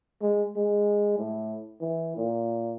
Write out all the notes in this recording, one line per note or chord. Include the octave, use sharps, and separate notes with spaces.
G#3
G#3
A2
E3
A#2